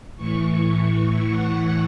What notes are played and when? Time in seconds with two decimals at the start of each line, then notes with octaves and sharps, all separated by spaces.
0.16 A2 E3 C#6
0.53 C#6
0.90 A2 E3 C#6
1.25 F#5